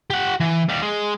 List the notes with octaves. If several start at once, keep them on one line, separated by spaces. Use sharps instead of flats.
G4 F#5
E3
D#2 G3
G#3